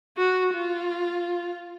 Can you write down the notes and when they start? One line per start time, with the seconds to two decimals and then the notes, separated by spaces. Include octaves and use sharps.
0.18 F#4
0.53 F4